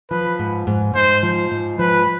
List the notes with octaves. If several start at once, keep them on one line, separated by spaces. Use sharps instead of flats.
F3 B4
G#2
G#2
G#2 C5
F3
G#2
F3 B4